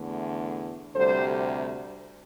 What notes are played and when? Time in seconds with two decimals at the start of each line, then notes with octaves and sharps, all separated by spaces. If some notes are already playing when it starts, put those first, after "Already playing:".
Already playing: E2 D3 A3
0.95 D2 C3 G3 A4 C5